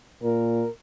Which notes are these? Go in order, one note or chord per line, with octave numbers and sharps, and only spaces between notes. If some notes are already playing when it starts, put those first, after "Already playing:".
A#2 A#4